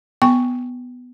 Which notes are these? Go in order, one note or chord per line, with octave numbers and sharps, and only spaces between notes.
B3 G5 C#6